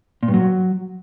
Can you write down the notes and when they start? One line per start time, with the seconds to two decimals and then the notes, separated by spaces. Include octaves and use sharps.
0.23 A#2
0.28 G2
0.34 F#3